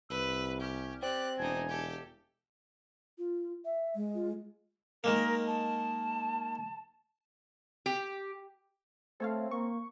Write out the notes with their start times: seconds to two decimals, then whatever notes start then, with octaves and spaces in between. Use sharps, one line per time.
0.10 C2 B4 E6
0.61 C#4 G4
1.02 C4 G4 D5 F#6
1.38 E1 D4 D#4 G#5
1.70 G4 A4
3.18 F4
3.65 E5
3.95 G#3
4.14 F4
5.04 D#3 G#3 A#3 A#4
5.47 A5
7.86 G4
9.20 A3 C4 A4 C#5 F5
9.51 A#3 C#6